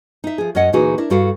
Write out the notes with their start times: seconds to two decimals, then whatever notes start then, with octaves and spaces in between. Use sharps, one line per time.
0.24 D#4 E5
0.38 F3 G#4
0.55 F#2 C#4 C#5 D#5 F#5
0.72 D2 A#2 E3 D#4 F#4 G#4
0.98 D4 E4 A#4
1.10 G2 G3 F#4 A4 F5